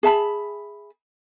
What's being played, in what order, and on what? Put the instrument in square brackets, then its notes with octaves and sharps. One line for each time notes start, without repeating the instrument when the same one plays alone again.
[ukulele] G#4 E5 A5 B5